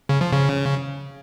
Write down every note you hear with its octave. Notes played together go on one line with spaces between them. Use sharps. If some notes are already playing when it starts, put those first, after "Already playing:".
C#3
F3
C#3